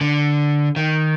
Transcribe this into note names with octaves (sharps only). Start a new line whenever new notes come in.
D3
D#3